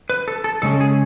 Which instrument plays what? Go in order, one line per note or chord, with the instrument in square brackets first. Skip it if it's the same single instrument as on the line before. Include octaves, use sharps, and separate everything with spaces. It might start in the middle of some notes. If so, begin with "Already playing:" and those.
[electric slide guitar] B4
A4
A4
C#3 G#3 C#4 A4
G#4